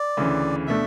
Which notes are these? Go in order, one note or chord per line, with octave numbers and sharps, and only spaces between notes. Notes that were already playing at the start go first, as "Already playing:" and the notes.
Already playing: D5
D2 C#3 E3
B2 A3 D4 E5